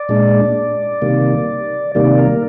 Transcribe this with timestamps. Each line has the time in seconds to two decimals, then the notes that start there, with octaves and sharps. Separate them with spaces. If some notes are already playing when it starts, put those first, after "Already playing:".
Already playing: D5
0.09 A#2 G#3 D4
1.02 C3 D#3 G3 A#3
1.95 C3 D#3 G3 A#3 D5
2.19 A#4